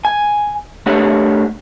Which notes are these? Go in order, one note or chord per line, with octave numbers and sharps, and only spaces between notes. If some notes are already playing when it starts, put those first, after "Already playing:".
G#5
A3 D4 G4 C#5 F#5